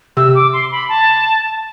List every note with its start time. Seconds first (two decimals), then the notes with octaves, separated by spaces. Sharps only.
0.17 C3 E6
0.35 D6
0.53 C6
0.71 B5
0.89 A5